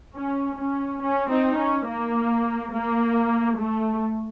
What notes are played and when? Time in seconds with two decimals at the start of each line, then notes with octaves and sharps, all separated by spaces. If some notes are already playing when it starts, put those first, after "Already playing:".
0.15 C#4
0.59 C#4
1.02 C#4
1.30 C4 D#4
1.59 C#4
1.88 A#3
2.73 A#3
3.59 A3